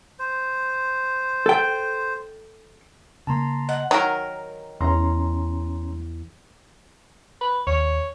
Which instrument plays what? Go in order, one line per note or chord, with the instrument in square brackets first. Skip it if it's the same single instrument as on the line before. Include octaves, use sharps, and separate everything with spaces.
[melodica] C5
[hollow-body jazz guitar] A4 G5
[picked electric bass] C#3 A#3 [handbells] A5 A#5 C6
[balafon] D#5 [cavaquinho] F#5
[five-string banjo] D#3 A#4 [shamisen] F#3
[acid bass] E2 [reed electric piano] C#4 A#5 C6
[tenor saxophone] B4
[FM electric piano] D#2 [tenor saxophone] C#5